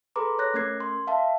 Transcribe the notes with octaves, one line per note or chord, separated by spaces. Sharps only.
G#4 A4 B4 A#5 C6 D6
C#5 F#6 A#6
A3 C#4 A#4 G#6 C7
C6
E5 F5 A5